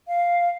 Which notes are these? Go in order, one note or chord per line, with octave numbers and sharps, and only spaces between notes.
F5